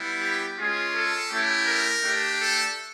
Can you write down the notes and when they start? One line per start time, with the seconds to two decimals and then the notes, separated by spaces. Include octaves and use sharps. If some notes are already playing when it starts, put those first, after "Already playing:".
Already playing: G3 B3 E4
0.22 G4
0.58 G#3 C#4 F4 G#4
0.95 A4
1.31 A3 C#4 E4 G4
1.67 A#4
2.04 A3 D4 G4
2.40 A4